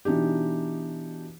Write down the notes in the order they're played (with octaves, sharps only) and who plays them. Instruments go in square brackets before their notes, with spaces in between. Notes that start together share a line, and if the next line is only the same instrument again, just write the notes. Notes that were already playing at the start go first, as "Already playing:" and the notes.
[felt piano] B2 E3 D4 D#4 G4